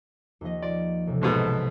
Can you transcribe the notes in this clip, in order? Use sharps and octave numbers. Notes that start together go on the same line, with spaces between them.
D#2 F3 D#5
F4 D5
A1 C3
C2 G#2 B2 A5